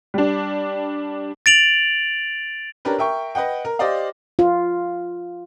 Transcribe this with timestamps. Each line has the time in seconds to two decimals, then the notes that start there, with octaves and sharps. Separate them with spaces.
0.14 G3 D4
1.46 A6 D7 F7 F#7
2.85 C#4 D4 G4 A#4 B4
2.98 A#4 E5 G5 C#6
3.35 B4 D#5 F#5 G5
3.65 A#4
3.79 G4 C5 D5 D#5 F5
4.39 F4